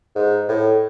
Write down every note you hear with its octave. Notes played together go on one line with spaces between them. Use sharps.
G#2
A2